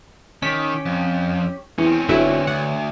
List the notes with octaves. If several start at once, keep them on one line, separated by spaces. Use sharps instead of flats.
D#3 C#4 G4 B6
F2
E2 C4 C#4
G1 D3 F#3 E4 B4 C#5
D2 F#5